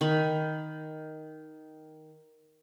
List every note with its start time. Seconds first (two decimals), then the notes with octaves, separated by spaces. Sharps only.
0.01 D#3 B5